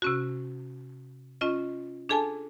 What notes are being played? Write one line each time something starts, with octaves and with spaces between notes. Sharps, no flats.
C3 C#4 F#4
C#4 F4 D#5
D4 G#4 A4 G#5 A5